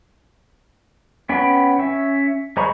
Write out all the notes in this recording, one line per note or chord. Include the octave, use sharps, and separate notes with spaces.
B3 C#4 G5 B5
C#4 E5
G#3 C5 A#5 B5 C#6